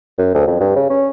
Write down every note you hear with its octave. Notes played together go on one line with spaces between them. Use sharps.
F#2
D2
F2
G2
C#3
C#4